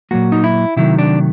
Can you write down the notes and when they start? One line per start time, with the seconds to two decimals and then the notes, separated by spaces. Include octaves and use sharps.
0.11 A#2 F#3 A#3 F#4
0.32 D#4
0.44 E4
0.76 C3 D#3 F#3 A3 E4
0.99 D4